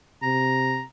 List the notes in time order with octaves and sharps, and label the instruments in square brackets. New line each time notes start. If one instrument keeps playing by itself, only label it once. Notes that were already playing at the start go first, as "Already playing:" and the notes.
[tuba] C3 [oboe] A#5